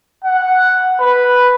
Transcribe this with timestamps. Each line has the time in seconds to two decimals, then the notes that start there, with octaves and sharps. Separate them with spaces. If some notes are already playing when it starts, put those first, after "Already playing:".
0.25 F#5
1.00 B4